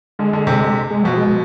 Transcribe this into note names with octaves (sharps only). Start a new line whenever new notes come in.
D3 G#3
D3
C3
G#3
B2 F3
G#3